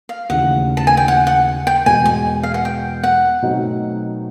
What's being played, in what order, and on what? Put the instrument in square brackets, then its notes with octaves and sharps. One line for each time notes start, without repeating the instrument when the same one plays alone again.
[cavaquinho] F5
[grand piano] D#2 C#3 E3 A3 [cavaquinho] F#5
[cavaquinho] A5
G#5
G5
F#5
F#5
G5
[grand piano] E2 B2 G#3 [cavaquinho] G#5
[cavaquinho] G#5
F5
F#5
G5
F#5
[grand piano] B2 F#3 A3 C4 D#4